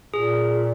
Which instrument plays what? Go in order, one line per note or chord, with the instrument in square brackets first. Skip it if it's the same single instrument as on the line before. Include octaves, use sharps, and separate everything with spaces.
[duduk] A#2 [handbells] G#4